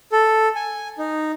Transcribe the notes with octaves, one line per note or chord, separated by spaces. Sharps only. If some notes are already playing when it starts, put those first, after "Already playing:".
A4
G#5
D#4